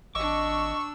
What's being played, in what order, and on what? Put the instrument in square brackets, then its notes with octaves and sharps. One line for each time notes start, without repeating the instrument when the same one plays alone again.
[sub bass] G#1 [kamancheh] D4 E6 [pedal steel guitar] D#5 D6 [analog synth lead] C#6